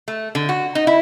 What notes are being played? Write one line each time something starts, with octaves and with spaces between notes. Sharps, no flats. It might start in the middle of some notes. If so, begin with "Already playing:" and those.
A3
D3
F#4
D#4
E4